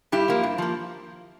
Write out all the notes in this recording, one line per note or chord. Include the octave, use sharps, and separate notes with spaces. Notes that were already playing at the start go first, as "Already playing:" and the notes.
G2 E4 G4
F3 A#3
G2
F3 A#3